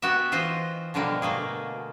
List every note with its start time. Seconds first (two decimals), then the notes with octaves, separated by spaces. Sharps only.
0.02 B3 F#4 G4 E5
0.32 E3 F4 C5 D#5
0.94 B2 D3 F3 G3 A#3
1.22 B2 A3 A#3 G#4